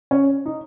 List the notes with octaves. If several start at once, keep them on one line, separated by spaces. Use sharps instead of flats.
C#4
D#4